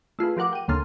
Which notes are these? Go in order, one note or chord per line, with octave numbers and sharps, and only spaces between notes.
A3 F4 G#4 B4
F3 G4 A#4 F#5 D6
G5 D#7
D2 C#3 A#3 C6 F6 A6